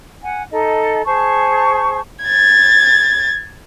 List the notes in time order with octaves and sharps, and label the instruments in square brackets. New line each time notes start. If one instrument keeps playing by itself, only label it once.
[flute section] F#5 G#5
D#4 A4 D#5
G#4 C5 A5 C#6
[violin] G#6 A6